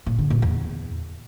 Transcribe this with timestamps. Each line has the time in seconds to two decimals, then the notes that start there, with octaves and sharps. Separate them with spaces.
0.06 A#2
0.18 D3
0.30 A#2
0.42 E2